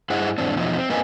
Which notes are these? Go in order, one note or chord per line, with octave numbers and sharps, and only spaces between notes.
G2 E4 G#4 C5 D#5 F#5
E2 G#2 C4 D4
E2 B2 F3 F#3 D#4
C4
G2 A#3 B4 D#5 G#5